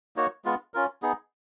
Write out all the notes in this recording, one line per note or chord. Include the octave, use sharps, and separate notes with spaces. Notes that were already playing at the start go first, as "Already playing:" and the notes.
A#3 D#4 F#4 C#5
G#3 B3 F4
C#4 F4 A#4
B3 D#4 G#4